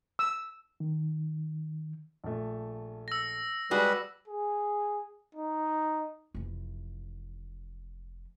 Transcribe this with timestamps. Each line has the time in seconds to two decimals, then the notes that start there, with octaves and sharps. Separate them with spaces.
0.19 E6
0.80 D#3
2.24 A#1 A3
3.08 E6 A#6
3.71 G3 G#3 F#4 B4 D6
4.28 G#4
5.35 D#4
6.34 F1 E3